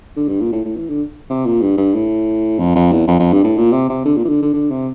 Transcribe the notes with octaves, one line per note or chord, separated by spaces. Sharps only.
D3
G2
A#2
A2
A2
E3
D3
C3
A#2
G2
G2
A2
F2
F2
E2
F2
F2
G2
A2
A#2
C3
C3
D3
A#2
E3
D3
D3
D3
C3